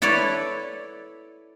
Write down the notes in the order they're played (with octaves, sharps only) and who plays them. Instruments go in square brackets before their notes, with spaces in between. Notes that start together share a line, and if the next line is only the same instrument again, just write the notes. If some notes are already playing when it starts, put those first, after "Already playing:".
[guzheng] E4 A4 B4 C#5 D5